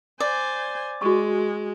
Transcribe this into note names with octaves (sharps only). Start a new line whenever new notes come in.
C5 D5 G#5
G#3 F#4 C#6